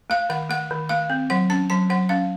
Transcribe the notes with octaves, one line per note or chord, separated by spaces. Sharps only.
A3 F5
D#3 F#5
A3 F#5
D#3
A3 F5
C4
F#3 F#5
C#4 A5
F#3 A5
F#3 F#5
C#4 F5